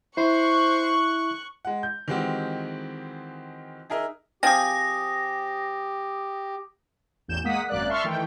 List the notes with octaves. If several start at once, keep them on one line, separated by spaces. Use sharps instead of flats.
E4 C5 C#6 F#6
G#3 F#5
G6
D#3 E3 G#3 C4 F#4 G4
D#4 G#4 A#4 E5
F3 C4 G4 G#4 D#6 A#6
A1 E2 G6 E7
G#3 A#3 F#5 D#6 B6
G#1 F#2 A#3 D5 F#6
E5 A5 C6 C#6 F6
D#3 E3 A3 G5